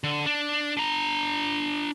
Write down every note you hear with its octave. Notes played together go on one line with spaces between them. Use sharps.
D3
D4
D4 A#5